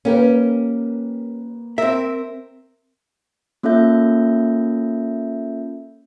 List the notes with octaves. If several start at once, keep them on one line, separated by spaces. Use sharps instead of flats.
A#3 C#4 G4 A#4 B4
C4 A#4 E5
A#3 C#4 F4 A4 E5 G6